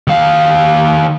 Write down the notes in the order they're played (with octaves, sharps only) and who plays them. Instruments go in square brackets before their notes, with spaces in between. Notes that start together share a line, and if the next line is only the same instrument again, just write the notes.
[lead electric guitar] D#3 F5